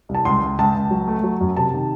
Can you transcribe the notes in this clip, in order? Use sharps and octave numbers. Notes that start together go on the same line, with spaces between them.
C2
A5
C#2 C6
C#2
C#2 A5
C#2
F#3
A3
F#3
F#2
C3 A5
D#3